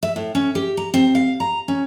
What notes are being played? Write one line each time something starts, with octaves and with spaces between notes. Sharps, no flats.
E5
A2
C#4
G4
A#5
C4
F5
A#5
C#4